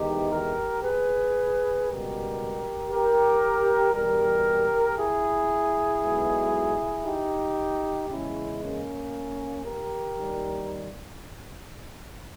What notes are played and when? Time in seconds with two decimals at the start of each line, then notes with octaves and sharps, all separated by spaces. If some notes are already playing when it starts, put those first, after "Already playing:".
Already playing: E2 D#3 G#3 D#4 G4
0.32 G4 A#4
0.84 G#4 B4
1.87 C#2 B2 G3 G4 A#4
2.91 G4 A#4
3.94 E2 B2 G3 G4 A#4
4.98 E4 G#4
6.03 B1 B2 G#3
7.05 D#4 G4
8.09 E2 C#3 G#3 C#4 E4
8.61 A#3 C#4
9.64 G4 A#4
10.16 D#2 D#3 G3